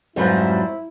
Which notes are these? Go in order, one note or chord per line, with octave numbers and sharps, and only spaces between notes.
F2 G#2 F#3 G3 E4 G4 B4 C5